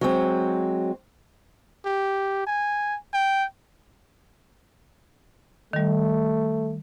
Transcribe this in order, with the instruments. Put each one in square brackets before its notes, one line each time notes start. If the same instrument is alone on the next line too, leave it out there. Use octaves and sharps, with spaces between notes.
[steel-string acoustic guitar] F#3 G#3 C4
[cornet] G4
G#5
G5
[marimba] D#3 G3 [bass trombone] A3